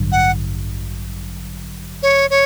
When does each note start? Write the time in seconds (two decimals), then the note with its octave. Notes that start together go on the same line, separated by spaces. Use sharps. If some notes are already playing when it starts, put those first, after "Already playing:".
Already playing: A1 G2 D3 F#3
0.12 F#5
2.03 C#5
2.30 C#5